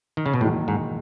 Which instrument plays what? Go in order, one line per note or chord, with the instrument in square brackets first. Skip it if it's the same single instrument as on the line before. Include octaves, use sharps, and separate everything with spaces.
[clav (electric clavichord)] D#3
C#3
B2
[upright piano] E1 D#2 D#3 F#3 [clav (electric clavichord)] A2
[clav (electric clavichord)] G#2